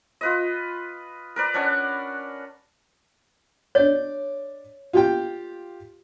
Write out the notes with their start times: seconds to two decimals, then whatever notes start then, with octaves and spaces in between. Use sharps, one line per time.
0.21 F4 B4 D#5
1.36 A#4 B4 D5
1.54 C#4 D4 D5 F#5
3.75 D4 C#5 D5
4.93 F4 G4 G5